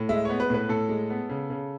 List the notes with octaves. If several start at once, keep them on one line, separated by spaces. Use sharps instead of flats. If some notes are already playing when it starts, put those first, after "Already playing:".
Already playing: A2
G#3 E5
B3 C#5
B4
A2 B4
A2 A4
G#3
B3
C#3
C#3